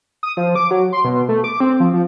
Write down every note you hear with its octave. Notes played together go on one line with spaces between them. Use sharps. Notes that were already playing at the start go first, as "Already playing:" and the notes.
D#6
F3
D6
F#3
C6
B2
A3
D6
C4
F3
F3